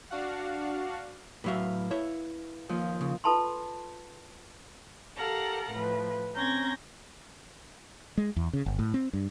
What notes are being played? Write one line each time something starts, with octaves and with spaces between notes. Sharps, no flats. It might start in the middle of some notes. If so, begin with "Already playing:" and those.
D4 F#4 F5 F#5
A2 F#3 B4 E5 F5
E4 C#5 E5
D#2 F3
C#3
F4 A4 B4 A5 B5 C6
G4 A4 A#4 F5 F#5 A#5
A2 F3 B4
C4 C#4 A#5 G6 G#6 A#6
G#3
E2
C#3
G1
A2
C4
G2